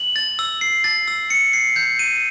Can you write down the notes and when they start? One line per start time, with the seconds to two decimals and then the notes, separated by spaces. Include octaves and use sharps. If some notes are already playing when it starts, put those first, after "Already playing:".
Already playing: F#7
0.16 A6
0.39 E6
0.61 C7
0.84 A6
1.07 E6
1.30 C#7
1.53 C7
1.76 G6
1.99 D#7